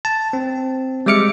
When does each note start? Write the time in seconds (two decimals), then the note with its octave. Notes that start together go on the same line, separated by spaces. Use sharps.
0.05 A5
0.33 C4
1.06 G3 G#3 E5 D6 F6 C#7